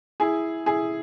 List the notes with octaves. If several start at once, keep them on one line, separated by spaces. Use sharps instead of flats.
E4 G#4
E4 G#4